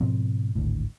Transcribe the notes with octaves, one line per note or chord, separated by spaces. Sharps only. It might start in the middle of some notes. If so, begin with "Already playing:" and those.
G#2 B2 F3 C4
G#1 D2 A2